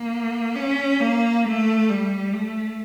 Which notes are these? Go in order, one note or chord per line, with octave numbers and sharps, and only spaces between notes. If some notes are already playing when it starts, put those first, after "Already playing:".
Already playing: A#3
C#4
A#3
A3
G3
A3